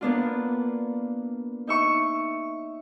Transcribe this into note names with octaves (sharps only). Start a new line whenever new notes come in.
A#3 B3 D4 F4
D#4 E5 C#6